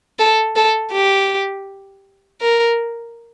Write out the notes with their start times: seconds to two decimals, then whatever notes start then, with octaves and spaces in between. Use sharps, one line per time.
0.19 A4
0.56 A4
0.93 G4
2.41 A#4